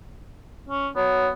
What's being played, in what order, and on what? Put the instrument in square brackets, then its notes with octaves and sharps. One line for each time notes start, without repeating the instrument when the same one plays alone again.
[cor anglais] C#4
[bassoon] F#3 [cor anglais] B3